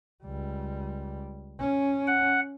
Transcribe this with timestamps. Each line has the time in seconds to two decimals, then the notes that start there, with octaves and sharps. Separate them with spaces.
0.24 C#2 G3
1.60 C#4
2.07 F#5